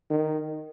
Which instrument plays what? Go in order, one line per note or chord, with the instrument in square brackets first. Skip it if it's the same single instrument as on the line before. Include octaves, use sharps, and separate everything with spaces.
[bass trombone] D#3